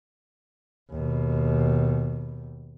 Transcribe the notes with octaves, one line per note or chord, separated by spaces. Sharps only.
D#2 B2